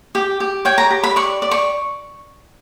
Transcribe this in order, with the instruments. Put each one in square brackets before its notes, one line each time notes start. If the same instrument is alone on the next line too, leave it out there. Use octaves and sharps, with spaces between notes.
[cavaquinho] G4
G4
C#5 G5
A#5
G4
B5
D5 C#6
D5
C#6